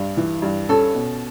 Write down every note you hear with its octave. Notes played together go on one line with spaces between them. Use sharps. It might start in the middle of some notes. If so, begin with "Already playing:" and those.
Already playing: G2
E3
G2
C#4 A4
B2